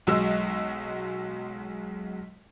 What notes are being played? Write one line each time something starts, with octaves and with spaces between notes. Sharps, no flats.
B1 F#3 G#3 E6